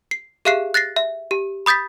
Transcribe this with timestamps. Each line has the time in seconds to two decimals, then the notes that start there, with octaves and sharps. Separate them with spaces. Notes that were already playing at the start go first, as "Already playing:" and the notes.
0.11 C7
0.45 G4 G#4 E5 F5 F#6 C7
0.74 F#6 A6 A#6 C7
0.96 E5
1.31 G4
1.66 B5 D#6 G6 A6 B6